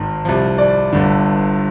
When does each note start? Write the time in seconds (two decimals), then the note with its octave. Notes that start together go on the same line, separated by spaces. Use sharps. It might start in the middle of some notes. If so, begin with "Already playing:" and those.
Already playing: G#1 G#2 D#3 C5
0.25 C2 C3 F3
0.58 D5
0.93 G1 G2 D3